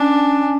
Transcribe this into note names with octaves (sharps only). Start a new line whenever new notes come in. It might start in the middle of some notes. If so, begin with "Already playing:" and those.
Already playing: C#4 D4